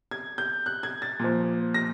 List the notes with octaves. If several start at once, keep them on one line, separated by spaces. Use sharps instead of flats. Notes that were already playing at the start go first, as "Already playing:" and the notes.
G#6
G6
F#6
G#6
A6
A#2 F3
A#6